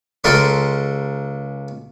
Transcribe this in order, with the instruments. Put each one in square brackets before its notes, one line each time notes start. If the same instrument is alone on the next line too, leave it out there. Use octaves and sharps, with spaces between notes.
[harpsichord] C#2 G#3 A4 A#4 C6 D#6